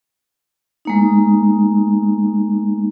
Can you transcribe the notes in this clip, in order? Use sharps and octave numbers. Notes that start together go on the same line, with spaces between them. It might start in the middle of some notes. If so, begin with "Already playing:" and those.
G#3 A#3 D#4